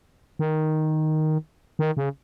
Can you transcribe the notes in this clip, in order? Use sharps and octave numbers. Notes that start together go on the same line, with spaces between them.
D#3
D#3
C#3